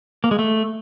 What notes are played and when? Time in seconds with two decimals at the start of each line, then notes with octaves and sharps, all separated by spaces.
0.24 A#3
0.31 G#3
0.39 A3